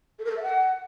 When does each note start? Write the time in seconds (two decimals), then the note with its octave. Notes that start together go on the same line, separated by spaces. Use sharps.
0.19 A4
0.25 A#4
0.31 A4
0.37 E5
0.43 F#5